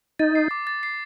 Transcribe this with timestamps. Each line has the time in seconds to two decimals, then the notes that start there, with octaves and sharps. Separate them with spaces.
0.19 D#4 A6
0.35 C7
0.51 D6
0.67 A6
0.83 C7